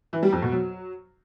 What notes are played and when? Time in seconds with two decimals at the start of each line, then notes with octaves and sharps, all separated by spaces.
0.13 E3
0.23 G3
0.32 F2
0.42 B2
0.52 F#3